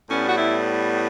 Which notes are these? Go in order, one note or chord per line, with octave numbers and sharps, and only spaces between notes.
A2 G3 B3 C#4
F#4
E4